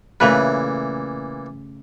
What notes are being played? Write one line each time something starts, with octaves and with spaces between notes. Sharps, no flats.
A#2 C#3 E3 A3 B4